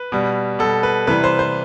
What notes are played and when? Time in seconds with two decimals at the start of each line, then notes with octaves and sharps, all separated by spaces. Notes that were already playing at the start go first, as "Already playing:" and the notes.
Already playing: B4
0.12 B2 G3
0.59 B2 G3 A4
0.83 B4
1.07 C3 E3 G3 B4
1.24 C5
1.39 C5